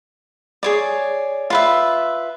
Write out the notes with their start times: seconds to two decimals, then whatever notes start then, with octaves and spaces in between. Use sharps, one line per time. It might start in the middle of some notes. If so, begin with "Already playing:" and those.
0.63 G#4 C#5 D5
1.50 F4 B4 E5